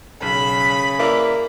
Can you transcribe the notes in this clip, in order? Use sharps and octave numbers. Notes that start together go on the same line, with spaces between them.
B1 C#3 B5
A#3 E4 B4 D5